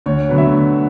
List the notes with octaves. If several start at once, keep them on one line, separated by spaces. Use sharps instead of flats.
D2 C#5
D3 F#3 B3
E5
D2